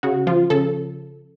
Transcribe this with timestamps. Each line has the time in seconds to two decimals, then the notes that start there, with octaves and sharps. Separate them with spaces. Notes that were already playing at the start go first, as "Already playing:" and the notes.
0.03 C#3 F#4
0.27 F3 F4
0.50 C#3 A4